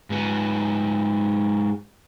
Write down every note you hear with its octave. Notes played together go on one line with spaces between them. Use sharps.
G#2 B3